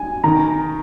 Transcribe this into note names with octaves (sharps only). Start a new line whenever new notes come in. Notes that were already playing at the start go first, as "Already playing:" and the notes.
Already playing: G#5
D#3 A#5